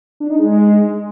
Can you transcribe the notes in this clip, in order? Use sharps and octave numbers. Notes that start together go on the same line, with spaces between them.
D4
D#4
G#3